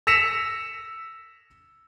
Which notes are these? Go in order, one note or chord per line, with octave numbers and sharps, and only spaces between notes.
E6 A#6 B6 C#7 E7 F7